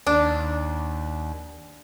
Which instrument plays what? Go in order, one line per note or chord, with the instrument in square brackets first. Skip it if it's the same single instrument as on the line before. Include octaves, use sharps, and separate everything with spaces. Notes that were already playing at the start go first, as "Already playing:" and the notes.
[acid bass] D#2 [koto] D4